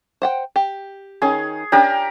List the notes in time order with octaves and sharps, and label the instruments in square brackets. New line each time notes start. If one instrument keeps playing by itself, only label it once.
[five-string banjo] C5 F#5 G5
G4
[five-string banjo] D#3 C#4 D#4 [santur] G#4
[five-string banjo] C#4 D4 [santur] G4 A#4